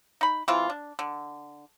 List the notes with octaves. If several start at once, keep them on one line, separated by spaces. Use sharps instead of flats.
D#4 B5
E3 G#3 C4 F4
D4
D3